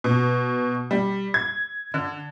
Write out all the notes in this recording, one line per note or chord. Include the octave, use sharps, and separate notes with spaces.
B2
G3
G#6
D3